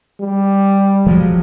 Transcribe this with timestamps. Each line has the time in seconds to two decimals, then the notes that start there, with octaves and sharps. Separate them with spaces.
0.21 G3
1.07 F3 F#3 G#3